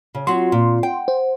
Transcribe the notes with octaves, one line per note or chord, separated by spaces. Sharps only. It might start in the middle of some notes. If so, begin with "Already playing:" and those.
C#3
F#3 C4 F4 F#4 C6
A#2
F#5 G5
C5